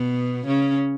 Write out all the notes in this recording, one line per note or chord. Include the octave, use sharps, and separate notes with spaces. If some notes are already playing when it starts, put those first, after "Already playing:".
Already playing: B2 B3
C#3 C#4